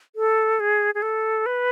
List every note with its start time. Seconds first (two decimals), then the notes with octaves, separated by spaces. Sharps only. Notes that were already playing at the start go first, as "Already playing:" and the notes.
0.16 A4
0.60 G#4
0.95 G#4
1.02 A4
1.46 B4